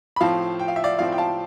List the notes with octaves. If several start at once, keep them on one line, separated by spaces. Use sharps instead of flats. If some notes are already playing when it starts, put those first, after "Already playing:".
B5
A2 F3 C4 F5 A5
G5
F5
E5
D5 F5
A2 F3 C4 D5 F5
G5
F5 A5